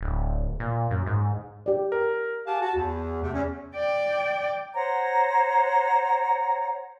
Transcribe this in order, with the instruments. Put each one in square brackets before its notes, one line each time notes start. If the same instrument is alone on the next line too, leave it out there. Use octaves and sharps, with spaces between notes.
[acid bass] D1
A#2
F#2
G#2
[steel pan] G4 D5
[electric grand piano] A#4
[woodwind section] G4 G#4 F5 F#5 G#5 A5
F#4 A5
E2
C3 A3
E2 C#4
[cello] D5 G5
[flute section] C5 C#5 F#5 A#5